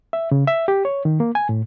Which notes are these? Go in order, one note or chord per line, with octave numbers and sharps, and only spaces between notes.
E5
C#3
E5
G4
C#5
D#3
A#3
G#5
A2